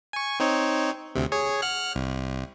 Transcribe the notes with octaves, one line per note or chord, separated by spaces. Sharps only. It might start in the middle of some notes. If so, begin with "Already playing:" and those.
G#5 C#6
C4 D#4 C#5
D2 C3
G#4 C#5
F#5 F6 F#6
C2